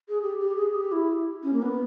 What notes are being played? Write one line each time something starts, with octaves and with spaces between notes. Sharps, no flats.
G#4
G4
G4
G#4
G4
E4
C#4
A#3
B3